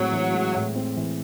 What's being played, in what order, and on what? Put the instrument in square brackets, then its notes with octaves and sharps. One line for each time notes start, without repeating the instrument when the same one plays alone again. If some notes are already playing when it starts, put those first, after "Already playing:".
Already playing: [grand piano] A2 G#3 C4 [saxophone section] F#3
[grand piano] E3
G#3
A2
C4
E3